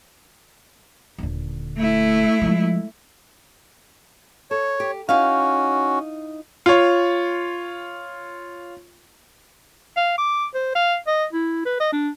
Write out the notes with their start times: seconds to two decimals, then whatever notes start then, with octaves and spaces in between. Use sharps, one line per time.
1.18 D#1 D3
1.77 A3 E4
2.42 F3 G#3
4.51 A4 C#5
4.80 G4
5.09 C#4 D#4 E4 F#4 F5
6.66 F4 C#5
9.97 F5
10.18 D6
10.55 C5
10.75 F5
11.07 D#5
11.33 E4
11.65 B4
11.80 D#5
11.93 D4